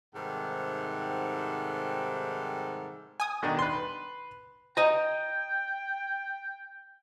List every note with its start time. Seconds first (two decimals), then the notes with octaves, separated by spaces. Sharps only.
0.15 G#2 C3 D#3 G3 A4 F#5
3.20 G#5 D#6
3.43 B2 D#3 D4
3.59 B4 C6
4.77 D#5 G5 A#5